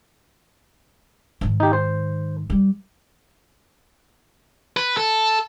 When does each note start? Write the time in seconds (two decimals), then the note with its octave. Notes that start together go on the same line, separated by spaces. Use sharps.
1.41 G#2 D#3
1.60 D#4 G4
1.73 C5
2.50 G3
4.77 B4
4.97 A4